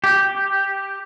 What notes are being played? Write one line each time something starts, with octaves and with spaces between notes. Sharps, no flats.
G4